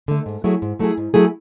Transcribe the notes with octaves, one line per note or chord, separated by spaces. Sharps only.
D3 A3
G#2
F#3 A3 E4 G#4
G#2
F#3 A3 E4 G#4
G#2
F#3 A3 E4 G#4